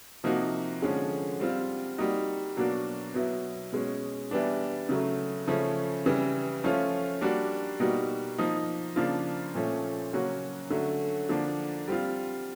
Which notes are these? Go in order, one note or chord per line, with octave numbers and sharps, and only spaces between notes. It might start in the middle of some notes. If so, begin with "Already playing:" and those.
C3 F3 A#3 D#4 F#4
D3 F3 G#3 C#4
G3 C4 F4
G3 A#3 D#4 F#4
B2 F#3 A#3 D4 F#4
B2 F#3 B3 E4
B2 G#3 C#4
E3 G3 B3 D4
C#3 F#3 A3
C#3 F3 A3 C#4
C#3 E3 G3
F3 A3 C#4 F4
G3 A#3 D4 F#4
B2 G3 A#3 D#4 F#4
F3 A#3 D#4
C#3 F3 A#3 D4 F4
A#2 F3 A3 C#4
C#3 F#3 A#3 C#4 F#4
D3 F#3 A3 C#4
D3 F3 A#3 D4
G3 C4 F4